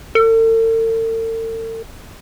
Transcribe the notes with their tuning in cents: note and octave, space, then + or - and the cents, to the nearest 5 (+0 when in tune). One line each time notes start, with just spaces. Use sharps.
A4 +45